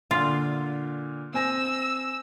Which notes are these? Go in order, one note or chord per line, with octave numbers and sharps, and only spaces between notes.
A#2 D3 F4
C4 G#5 E6 A#6